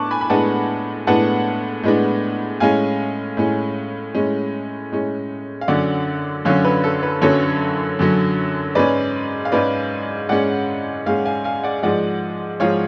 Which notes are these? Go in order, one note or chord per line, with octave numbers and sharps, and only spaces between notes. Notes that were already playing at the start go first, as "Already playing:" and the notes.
Already playing: A2 B3 D4 A5 C#6 D6 F#6
G#5 B5
B5
A2 G#3 B3 D4 F#5 A5
A2 G#3 B3 D4 F#5 A5
A2 G#3 B3 D4
A2 G#3 C#4 F5 G#5
A2 G#3 C#4
A2 G#3 C#4
A2 G#3 C#4
F5
F#2 D3 F#3 C#4 D5 F#5
F#2 D3 F#3 C#4 C#5 F5
B4
A4
B4
F#2 D3 F#3 C#4 A4 C#5
F#2 D3 F#3 C#4
G#2 G#3 C#4 B4 D5
F5
G#2 G#3 C#4 B4 D5
G#2 G#3 C#4 D5 F#5
G#2 G#3 C#4 F5 G#5
F5 G#5
F5 G#5
D5 F#5
G#2 F3 G#3 D5 F#5
G#2 F3 G#3 C#5 F5